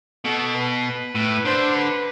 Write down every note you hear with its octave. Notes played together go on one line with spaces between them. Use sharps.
B2 A4
B4
A2
D3 C5
B4